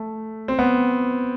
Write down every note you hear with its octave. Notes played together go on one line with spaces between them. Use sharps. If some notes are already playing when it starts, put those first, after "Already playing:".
Already playing: A3
C4
B3